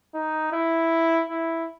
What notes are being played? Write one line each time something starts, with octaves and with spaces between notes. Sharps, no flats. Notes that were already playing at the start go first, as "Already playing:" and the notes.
D#4
E4
E4